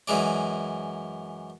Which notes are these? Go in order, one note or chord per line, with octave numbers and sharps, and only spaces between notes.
F#2 E3 G#3 D5